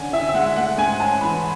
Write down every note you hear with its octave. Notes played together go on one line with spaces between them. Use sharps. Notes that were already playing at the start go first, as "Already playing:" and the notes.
Already playing: D3 C#4 G#5
E4 E5
E5
G#3 F#5
A3 F#5
G#2 G#5
C#4 A5
E3 B5